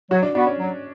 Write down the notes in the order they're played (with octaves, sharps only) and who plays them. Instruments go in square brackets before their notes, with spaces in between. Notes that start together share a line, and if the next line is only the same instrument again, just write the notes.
[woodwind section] F#3 [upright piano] F#4
[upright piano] D4
[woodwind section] B3 F#4 [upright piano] D4
[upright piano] C#4
[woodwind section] F#3